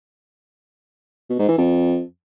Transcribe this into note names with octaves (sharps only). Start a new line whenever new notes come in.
B2
G#2
E3
F2